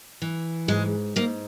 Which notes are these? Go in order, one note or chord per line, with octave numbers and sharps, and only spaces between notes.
E3
G#2 G#3
G#2 A#3